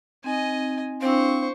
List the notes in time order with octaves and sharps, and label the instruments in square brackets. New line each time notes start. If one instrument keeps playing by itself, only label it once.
[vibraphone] C4 D#4 [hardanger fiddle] D#5 G#5
[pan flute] C4 [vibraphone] D4 E4 F5 [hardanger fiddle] C5 C#6